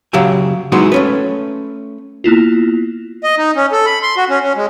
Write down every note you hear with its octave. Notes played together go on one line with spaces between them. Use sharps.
C#3 F#3 G4 E5 G#5
F#3 G#3 B3 D#4 E4 F#4
A3 C#4 B4
A#3 B3 E4 F4
D#5
D#4
C#4
A4
B5
C6
F#4
C#4
C#4
G#3